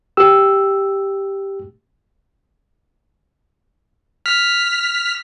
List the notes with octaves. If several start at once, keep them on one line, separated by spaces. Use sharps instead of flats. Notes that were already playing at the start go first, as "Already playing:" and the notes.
G4 E6
F6 B6